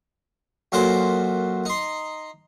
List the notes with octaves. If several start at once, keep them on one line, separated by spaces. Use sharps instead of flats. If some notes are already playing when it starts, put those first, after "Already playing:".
F#2 A#2 F#4 A4 C5 D6
D#4 C6